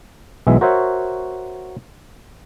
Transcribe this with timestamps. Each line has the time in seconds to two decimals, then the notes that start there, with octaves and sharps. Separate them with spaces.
0.47 B1 E3 G#3 E5
0.61 F#4 A#4 C5 C#5 E5 F#5